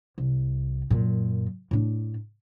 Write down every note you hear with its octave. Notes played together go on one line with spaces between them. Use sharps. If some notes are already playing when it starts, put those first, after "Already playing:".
C2
F#2 A#2
A2 D4